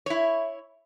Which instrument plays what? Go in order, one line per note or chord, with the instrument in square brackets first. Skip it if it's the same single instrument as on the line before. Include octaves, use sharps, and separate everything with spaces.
[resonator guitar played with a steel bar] E4 C#5